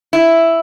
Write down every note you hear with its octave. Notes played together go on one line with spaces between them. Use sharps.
E4